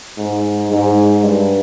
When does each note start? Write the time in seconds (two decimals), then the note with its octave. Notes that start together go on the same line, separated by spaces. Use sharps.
0.17 G#2
0.71 G#2
1.24 G2